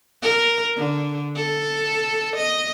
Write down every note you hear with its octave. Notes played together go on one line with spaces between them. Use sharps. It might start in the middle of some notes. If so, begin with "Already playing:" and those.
A#4
D3
A4
D#5